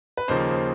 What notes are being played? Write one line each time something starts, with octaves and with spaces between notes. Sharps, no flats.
B4
D#2 C#3 F3 A#3 D#4 C5
C5